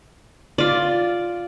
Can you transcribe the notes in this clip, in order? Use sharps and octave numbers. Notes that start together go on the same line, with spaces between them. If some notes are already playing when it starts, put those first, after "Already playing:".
F4 D5